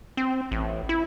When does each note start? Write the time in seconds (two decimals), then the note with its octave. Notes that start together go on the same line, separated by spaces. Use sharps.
0.17 C4
0.51 A1
0.89 E4